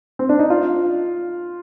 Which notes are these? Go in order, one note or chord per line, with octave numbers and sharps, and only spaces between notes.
C4
D4
D#4
F4